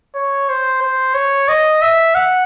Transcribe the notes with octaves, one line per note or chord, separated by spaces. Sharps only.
C#5
C5
C5
C#5
D#5
E5
F#5